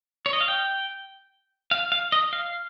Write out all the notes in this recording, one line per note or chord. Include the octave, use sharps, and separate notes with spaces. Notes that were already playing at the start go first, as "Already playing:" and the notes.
C#5
D#5
F5
G5
F5
F5
D#5
F5